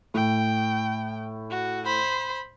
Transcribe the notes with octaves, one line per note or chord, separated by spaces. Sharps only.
A2 G5
F#4
C5 B5